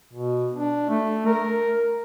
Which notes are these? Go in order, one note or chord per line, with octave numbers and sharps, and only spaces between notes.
B2
D4
A3
A#4